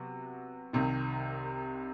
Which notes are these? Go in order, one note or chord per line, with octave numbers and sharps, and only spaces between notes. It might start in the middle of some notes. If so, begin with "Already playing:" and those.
Already playing: C3 F#3 B3 F#4
C2 C3 D#3